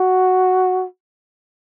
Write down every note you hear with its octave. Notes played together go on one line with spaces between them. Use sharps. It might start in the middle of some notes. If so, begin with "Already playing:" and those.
Already playing: F#4